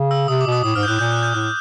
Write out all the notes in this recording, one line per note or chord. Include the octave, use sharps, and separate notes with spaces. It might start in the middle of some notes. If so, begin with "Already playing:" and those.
Already playing: C#3
E6
C3 D#6
D6
B2
D#6
A2 D#6
G#2 F6
G6
A2 F#6
A#2 G6
F#6
G6
A2 F#6